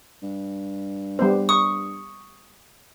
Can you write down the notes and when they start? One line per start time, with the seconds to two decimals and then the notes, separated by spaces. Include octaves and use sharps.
0.23 G2
1.19 G3 B3 C5
1.49 C#6 D#6